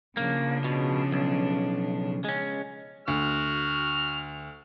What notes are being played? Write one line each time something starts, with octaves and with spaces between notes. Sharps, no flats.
C#3 F3 A#3 D4
B2
B1
G#3 C#4
D2 F#4 F6